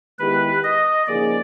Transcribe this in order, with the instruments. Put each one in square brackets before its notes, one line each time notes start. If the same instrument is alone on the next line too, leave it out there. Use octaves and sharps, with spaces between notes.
[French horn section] D#3 G#3 B3 E4 G4 [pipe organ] B4
[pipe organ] D#5
[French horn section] C#3 F3 A#3 D#4 G#4 [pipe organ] D5